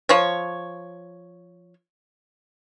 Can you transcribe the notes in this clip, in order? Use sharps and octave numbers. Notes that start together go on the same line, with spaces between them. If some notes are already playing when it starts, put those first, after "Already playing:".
F3 C#5